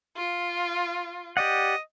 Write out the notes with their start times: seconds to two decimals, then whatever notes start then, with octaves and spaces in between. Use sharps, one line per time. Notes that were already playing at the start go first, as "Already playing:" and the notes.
0.17 F4
1.37 G4 D5 D#5 F#5